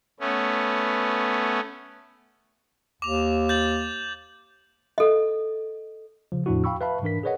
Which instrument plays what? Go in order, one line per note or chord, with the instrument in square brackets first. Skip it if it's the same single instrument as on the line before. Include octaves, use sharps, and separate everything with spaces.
[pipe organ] A3 B3 C#4
[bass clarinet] D#2 [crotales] D6 F7
[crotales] G6 A6 F#7
[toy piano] A4 D#5
[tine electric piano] C#3 F3
E2 A2 F3 D4 E4 F#4
F5 G5 B5 C#6 E6
B4 E5 F5 A5 B5
G#2 E3 D4 A#4 B6
G#4 A#4 B4 C#5 D#5 F#5